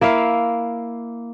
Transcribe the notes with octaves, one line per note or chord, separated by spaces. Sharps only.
A#3 E4 E5 F5